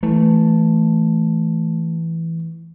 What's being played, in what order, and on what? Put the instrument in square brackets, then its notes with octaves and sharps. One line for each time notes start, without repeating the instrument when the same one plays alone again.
[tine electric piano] E3 [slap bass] A3